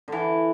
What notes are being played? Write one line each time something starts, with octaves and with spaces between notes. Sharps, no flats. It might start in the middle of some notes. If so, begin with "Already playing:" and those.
D3 E3